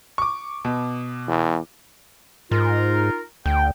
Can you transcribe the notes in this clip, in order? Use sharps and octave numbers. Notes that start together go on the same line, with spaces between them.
C#6 D6
B2
E2
G#2 D#4 F4 A#4
D2 G5